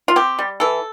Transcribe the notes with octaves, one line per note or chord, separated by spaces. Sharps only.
F4
C4 G4
G3
E3 A4